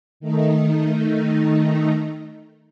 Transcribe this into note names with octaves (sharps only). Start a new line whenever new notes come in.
D#3 A3 D#4